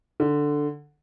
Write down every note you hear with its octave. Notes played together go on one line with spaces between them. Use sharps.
D3